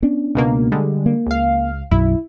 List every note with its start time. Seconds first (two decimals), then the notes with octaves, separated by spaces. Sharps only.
0.02 B3 C#4 D4
0.35 C#2 B2 A#3
0.72 D3 G3 G#3
1.06 A#3
1.26 C#2 F5
1.91 B1 F#2 E4